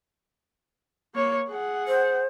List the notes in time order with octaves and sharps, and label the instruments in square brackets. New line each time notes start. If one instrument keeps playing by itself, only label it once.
[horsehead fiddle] A#3 C#5
G#4 F#5
[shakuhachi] C5